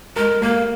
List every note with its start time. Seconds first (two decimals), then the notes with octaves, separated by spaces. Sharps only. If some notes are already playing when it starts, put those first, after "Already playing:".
0.16 G#3 A#4
0.42 A#3 A#4